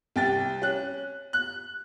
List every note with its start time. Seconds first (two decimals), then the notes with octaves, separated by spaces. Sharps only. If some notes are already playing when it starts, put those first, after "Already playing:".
0.16 C2 G5 A6
0.62 C#4 F#6
1.33 F#6